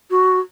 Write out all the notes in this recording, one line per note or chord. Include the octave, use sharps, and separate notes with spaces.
F#4